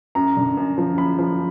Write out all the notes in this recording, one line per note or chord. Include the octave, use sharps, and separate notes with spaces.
F#2 A#5
D3
F#2
F3
F#2 B5
F3